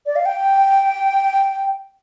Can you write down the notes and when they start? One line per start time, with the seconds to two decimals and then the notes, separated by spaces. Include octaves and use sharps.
0.06 D5
0.16 F5
0.26 G5